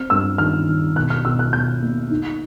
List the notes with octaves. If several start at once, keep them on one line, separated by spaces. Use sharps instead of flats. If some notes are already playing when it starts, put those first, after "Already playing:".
Already playing: C4 F6
G2 E6
D#3 F6
D#3
B2 F#6
F6
B2 E6
F#6
B2 G6
A#3
D#4